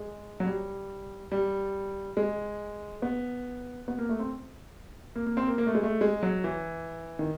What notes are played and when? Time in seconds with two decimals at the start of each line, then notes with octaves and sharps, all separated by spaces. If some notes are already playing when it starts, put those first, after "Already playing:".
Already playing: G#3
0.40 F#3
0.46 G3
1.32 G3
2.17 G#3
3.02 B3
3.88 B3
3.99 A#3
4.09 A3
4.20 C4
5.16 A#3
5.26 A#3
5.37 C4
5.48 A#3
5.58 A#3
5.67 A3
5.75 G#3
5.83 A3
6.01 G#3
6.23 F#3
6.44 E3
7.19 D#3